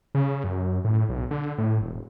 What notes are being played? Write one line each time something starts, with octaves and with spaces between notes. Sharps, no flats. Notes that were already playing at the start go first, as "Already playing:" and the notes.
C#3
F#2
A2
B1
D3
A2
E1